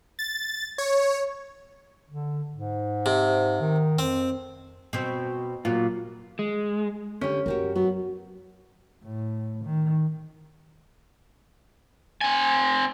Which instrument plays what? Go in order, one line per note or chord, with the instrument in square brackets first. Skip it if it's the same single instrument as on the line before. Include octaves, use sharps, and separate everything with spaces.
[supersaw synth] A6
C#5
[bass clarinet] D3
G#2
[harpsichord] C3
[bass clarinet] D#3
[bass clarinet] F2 [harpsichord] C4
[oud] B2 C4
[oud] A#2 [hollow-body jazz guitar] F#3 A#3 F4
[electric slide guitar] G#3
[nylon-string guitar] D3 G4 [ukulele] C#4
[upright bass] F#2 [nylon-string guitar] F#4 G4 A#4
[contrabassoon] F#3 [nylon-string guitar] B3
[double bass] A2
D#3
[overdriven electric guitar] C4 G#5